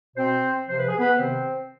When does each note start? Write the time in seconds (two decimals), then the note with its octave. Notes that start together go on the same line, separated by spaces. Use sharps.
0.16 B2 C4 C5
0.67 C3 F3 C5
0.78 B4
0.88 G#4
0.99 B3 B4
1.17 C3 D#3 C4 C5